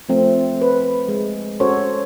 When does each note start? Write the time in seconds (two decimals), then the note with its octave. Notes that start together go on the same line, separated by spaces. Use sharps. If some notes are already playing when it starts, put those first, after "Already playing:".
0.09 F3 A3 C4
0.62 B4
1.08 G#3
1.60 C#4 F#4 A4 C5 C#5